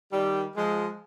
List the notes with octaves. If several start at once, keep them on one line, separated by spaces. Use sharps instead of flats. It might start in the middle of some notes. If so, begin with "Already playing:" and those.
D#3 G3
F3 G#3